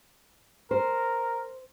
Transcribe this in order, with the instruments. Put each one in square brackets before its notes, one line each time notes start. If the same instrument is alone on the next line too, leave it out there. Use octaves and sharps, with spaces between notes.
[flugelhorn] A#4 [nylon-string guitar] C5